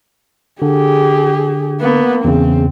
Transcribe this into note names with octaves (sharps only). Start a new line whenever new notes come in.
D3 G4 G#4
A#3 B3
E2 C#3 C4